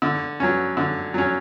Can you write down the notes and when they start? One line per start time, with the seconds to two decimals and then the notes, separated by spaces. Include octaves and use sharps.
0.02 D3
0.40 F#3 C#4
0.77 D3
1.14 F#3 C#4